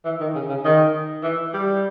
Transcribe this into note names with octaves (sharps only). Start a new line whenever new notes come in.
E3
D#3
C#3
C#3
D#3
E3
G3